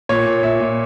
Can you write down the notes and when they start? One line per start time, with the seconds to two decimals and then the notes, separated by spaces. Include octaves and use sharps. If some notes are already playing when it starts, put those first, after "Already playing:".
0.09 A#2 C#5
0.26 A#2
0.43 A#2 E5
0.60 A#2